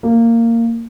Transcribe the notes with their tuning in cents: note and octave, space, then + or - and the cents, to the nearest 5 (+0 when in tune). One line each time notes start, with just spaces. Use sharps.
A#3 -15